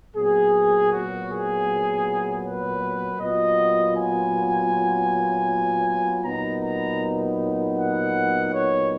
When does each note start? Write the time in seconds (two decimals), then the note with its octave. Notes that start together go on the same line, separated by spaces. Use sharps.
0.15 A#2 F#3 B3 G#4
0.91 F#4
1.29 G#4
2.44 B4
3.20 A#2 F#3 B3 F4 D#5
3.96 G#5
6.23 A#2 F#3 B3 D#4 A#5
6.62 A#5
7.76 F#5
8.52 C#5